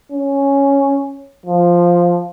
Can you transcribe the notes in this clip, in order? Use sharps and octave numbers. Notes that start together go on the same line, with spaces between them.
C#4
F3